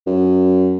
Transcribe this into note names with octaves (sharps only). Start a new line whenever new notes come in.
F#2